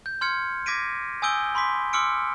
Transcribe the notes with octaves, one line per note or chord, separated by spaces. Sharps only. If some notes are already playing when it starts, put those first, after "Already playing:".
G6
C6 F6 G#6 C#7
D6 G#6 A#6 B6 D7 D#7
G#5 D#6 E6 G6 D7 G7
B5 C6 D6 B6
C6 D6 E6 F6 C#7 D7